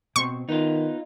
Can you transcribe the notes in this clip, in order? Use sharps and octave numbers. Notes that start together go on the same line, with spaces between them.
B2 C4 C6 C#6
D#3 B3 D#4 F4